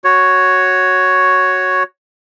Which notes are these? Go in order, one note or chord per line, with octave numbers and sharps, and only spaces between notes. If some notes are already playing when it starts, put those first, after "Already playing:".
F#4 C#5